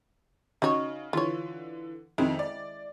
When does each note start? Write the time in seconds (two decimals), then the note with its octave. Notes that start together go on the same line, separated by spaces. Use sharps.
0.62 C#3 D#4 F#4 C#5
1.13 D3 E3 F4 C#5
2.18 F2 D#3 G#3 E4
2.39 D5